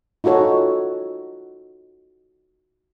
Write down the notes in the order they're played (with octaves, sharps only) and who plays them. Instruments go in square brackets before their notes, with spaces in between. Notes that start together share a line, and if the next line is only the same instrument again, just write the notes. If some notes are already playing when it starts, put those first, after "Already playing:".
[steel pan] D#4 F4 F#4 A4 C#5